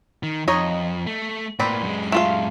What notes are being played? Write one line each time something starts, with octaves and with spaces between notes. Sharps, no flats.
D#3
F2 D#4 C#5 D#5
A3
A2 A#3 C4 B4 D5
F#2 G#3
A3 F4 F5